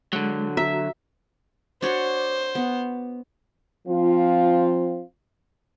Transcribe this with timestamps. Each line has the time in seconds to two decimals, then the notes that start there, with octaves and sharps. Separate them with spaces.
0.13 D3 F#3 G#3
0.57 F#4 E5 A#5
1.82 D4 F#4 C5 C#5
2.55 B3
3.87 F3 C4 F4